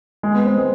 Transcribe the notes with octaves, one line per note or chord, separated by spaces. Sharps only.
G#3
B3
C4
G#3